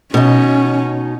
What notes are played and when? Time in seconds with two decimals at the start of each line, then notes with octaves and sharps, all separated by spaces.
0.14 B2 C#4 D#4